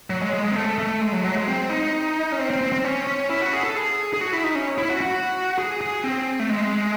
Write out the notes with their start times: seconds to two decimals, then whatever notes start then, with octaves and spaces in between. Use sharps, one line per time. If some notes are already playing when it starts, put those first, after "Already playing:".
0.10 F#3
0.21 G#3
0.33 G#3
0.44 G#3
0.51 C4
0.56 A3
0.78 A3
1.01 G#3
1.13 F#3
1.24 F#3
1.36 G#3
1.48 C4
1.70 D#4
2.32 C#4
2.39 C4
2.50 C4
2.61 C4
2.72 C4
2.84 C#4
3.07 C#4
3.29 E4
3.41 F#4
3.53 G#4
3.64 A4
3.76 G#4
4.14 G#4
4.21 F#4
4.32 E4
4.44 D#4
4.55 C#4
4.78 E4
4.89 F#4
5.01 F#4
5.59 G#4
5.81 G#4
6.04 C4
6.40 A3
6.50 G#3